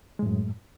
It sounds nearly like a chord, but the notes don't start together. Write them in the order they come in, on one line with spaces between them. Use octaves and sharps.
G#3 A2 F#2